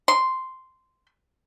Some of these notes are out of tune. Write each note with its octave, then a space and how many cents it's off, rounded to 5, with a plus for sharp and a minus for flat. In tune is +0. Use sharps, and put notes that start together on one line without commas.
C6 -5